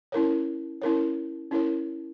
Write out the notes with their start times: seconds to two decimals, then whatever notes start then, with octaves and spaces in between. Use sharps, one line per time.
0.12 C#4 E4 A#4 C#5
0.82 C#4 E4 A#4 C#5
1.51 C#4 E4 A#4 C#5